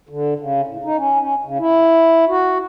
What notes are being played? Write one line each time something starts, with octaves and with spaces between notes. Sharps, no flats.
D3
C#3
A2
D#4
C#4
C#4
C#3
E4
F#4